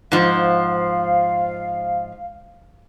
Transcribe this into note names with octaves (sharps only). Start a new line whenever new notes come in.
G#2 F3 F5